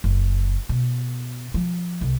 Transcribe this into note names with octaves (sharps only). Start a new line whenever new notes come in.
F#1
B2
F3
C2